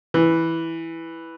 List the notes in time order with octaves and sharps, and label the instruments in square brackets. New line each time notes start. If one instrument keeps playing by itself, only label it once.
[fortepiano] E3